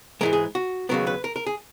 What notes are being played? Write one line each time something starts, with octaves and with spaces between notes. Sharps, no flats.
G#2 E3 G#3 A#4
G#4
F#4
D#2 C#3 F#3 B3 A#4
B4
A#4
A#4
G#4